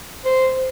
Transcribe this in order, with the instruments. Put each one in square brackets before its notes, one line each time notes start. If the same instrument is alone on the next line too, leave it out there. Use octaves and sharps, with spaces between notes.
[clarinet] C5